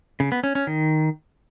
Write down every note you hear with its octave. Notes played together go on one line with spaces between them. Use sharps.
C#3
B3
C#4
C#4
D#3